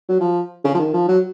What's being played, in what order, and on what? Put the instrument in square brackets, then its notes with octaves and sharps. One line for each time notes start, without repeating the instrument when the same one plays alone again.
[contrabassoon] F#3
F3
C#3
F3
D#3
F3
F#3